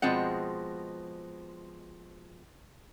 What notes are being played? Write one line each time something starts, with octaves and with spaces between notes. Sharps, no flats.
B2 F3 G#3 C4 F#5